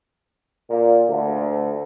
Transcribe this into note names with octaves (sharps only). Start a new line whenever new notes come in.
A#2
D2